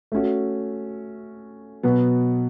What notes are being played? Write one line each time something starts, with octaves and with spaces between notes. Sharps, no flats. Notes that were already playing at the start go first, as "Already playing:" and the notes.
A3 C#4 F#4
B2 F#3 B3